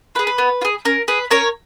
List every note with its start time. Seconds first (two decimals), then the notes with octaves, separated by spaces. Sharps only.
0.15 F4 B4
0.19 G#4
0.27 B4
0.38 B3
0.61 F4
0.65 G#4
0.85 C#4 A#4
1.08 G#4 B4
1.31 C#4 A#4 C#5